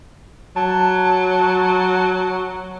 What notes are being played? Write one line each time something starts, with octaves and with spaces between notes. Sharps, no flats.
F#3 A5